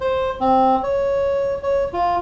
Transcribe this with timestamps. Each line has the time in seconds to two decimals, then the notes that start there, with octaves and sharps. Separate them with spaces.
0.01 C5
0.40 C4
0.83 C#5
1.63 C#5
1.93 F4